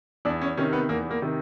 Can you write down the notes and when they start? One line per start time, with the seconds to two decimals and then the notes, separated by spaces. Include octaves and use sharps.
0.25 E2 D4
0.41 C#4
0.57 C3 D#3 C#4
0.73 B3
0.89 E2 A#3
1.11 A#3
1.22 C3 D#3